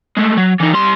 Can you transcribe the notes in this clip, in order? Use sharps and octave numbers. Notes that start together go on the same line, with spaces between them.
G#3 A3
F#3
E3 D#4
G3 C6